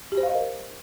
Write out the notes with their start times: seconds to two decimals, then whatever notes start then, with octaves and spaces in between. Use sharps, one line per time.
0.12 G4
0.18 C5
0.23 F5
0.29 D#5
0.34 A#4